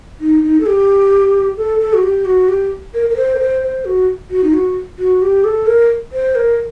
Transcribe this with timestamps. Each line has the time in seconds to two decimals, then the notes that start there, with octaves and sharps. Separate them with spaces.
0.21 D#4
0.43 D#4
0.60 A4
0.66 G4
1.57 A4
1.80 A4
1.94 F#4
2.03 G4
2.25 F#4
2.48 G4
2.94 A#4
3.09 A#4
3.17 C5
3.35 A#4
3.39 C5
3.62 C5
3.85 F#4
4.30 F#4
4.43 D#4
4.53 F#4
4.98 F#4
5.22 G4
5.44 A4
5.67 A#4
6.12 C5
6.35 A#4